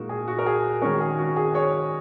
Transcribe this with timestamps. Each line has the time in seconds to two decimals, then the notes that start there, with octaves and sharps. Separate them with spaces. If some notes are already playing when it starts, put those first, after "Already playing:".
Already playing: A#2 G#3 D#4 F#4 A#4
0.09 G#4
0.28 F#4
0.39 A#4
0.46 G#4
0.82 D#3 G#3 C#4 F#4 A#4
1.01 G#4
1.18 F#4
1.37 G#4
1.54 G#4 C#5